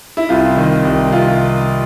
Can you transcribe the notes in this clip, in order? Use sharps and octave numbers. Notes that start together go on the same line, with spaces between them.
E4
C2 F4
D#3
C2
C3 F4